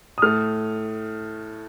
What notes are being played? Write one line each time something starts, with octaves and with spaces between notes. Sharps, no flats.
D#6
A2 A3 F6